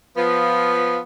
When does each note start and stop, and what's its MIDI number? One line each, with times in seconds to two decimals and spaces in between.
0.17 0.98 53
0.17 0.98 59